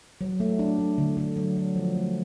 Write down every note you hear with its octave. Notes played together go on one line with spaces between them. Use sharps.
F#3
A3
D4
A3
D3
D3
F#3
F#3
F3
A3